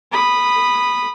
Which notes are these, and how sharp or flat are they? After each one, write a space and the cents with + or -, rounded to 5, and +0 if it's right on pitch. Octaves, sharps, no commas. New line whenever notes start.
B5 +0 D#6 -20